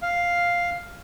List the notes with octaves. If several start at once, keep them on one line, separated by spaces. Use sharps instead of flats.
F5